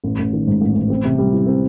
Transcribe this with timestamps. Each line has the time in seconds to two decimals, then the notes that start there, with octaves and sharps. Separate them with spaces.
0.04 A1
0.19 A1
0.33 D#3
0.47 G#2
0.61 A1
0.75 A1
0.90 C4
1.05 C3
1.18 G3
1.33 E3
1.47 C4